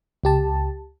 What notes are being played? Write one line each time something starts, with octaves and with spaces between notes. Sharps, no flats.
C#2 G4 A5